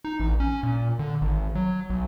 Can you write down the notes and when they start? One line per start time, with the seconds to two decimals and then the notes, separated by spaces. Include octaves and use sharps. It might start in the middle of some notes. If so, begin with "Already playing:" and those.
0.05 D#4
0.20 A1
0.40 C#4
0.63 A#2
0.99 D3
1.21 G#1
1.55 F#3
1.90 B1